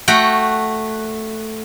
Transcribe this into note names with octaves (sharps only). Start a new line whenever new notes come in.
A3 F#4 G5